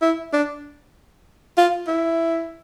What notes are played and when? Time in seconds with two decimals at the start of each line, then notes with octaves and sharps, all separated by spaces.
0.02 E4
0.33 D4
1.57 F4
1.88 E4